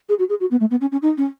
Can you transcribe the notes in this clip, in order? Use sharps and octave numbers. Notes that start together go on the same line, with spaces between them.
G#4
F#4
G#4
F#4
B3
A3
B3
C#4
C#4
D#4
C#4